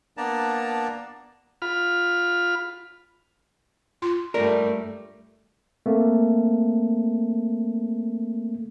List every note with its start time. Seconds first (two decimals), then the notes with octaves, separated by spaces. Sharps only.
0.17 A#3 B3 D4 D5 A5 A#5
1.62 F4 B5 F6
4.02 F4 C6
4.34 G2 G3 A3 A#4 D5
5.86 A3 A#3 C4